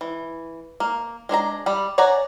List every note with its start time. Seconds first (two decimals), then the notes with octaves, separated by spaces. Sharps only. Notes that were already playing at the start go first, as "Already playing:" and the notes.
0.01 E3
0.80 A#3
1.29 G#3 D4 C5 A#5
1.66 G3 D5 B5
1.98 C#5 D5 F#5 G#5 A#5